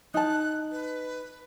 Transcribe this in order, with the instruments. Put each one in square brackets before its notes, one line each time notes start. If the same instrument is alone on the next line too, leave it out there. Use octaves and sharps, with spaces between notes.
[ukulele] D#4 A5 [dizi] F#6
[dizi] B4